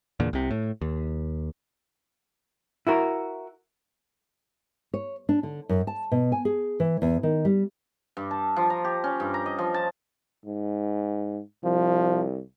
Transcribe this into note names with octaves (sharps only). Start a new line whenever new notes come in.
E2 A#2 D3
C2 C3
A2
D#2
E4 F#4 A#4
C#5
D4
D3
F#2
A5
B2
G#5
G#4
E3
E2
D#3
G3
G2
A5
F3
A#5
G4
C#4
G2
A#5
D#5
F3
A5
G#2
C2 F3